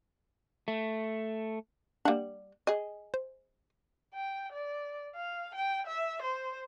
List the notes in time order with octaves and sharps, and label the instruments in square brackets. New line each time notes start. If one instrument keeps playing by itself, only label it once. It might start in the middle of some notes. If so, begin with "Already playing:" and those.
[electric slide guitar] A3
[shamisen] G3 F#5 [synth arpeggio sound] A#3 D4
[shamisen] G#4 D#5
[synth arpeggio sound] C5
[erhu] G5
D5
F5
G5
E5
C5